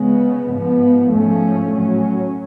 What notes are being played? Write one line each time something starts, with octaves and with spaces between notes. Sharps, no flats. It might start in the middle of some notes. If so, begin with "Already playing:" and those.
Already playing: C#3 G#3 B3
G#2 F3 B3
G#2 F3 A3 C#4
A2 F#3 C#4